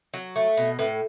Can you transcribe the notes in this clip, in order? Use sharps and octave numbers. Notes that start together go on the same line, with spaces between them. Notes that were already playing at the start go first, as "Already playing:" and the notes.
F#3
A3
B2
A2 B4